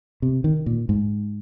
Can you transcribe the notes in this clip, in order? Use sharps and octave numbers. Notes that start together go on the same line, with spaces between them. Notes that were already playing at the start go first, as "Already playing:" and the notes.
C3
D#3
A#2
G#2